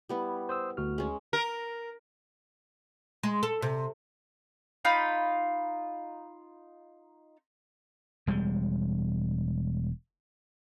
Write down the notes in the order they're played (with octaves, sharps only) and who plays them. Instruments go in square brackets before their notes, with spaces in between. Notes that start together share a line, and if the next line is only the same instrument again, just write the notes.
[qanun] G3 B3 E4
[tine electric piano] C5 D#6 E6
D2 F#4 F6
[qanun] G#3 C#4
[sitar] A#4
[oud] G#3
A4
C3
[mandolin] D#4 F4 B5
[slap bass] E1 G3 G#3